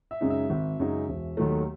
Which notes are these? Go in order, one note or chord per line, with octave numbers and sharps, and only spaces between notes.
E5
F#2 C#3 G#3 D#4
E5
G#1
F#2 C#3 G#3 D#4
E1
D#2 D#3 F#3 A3